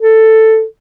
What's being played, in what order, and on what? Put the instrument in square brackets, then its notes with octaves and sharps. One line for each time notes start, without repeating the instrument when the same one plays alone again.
[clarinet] A4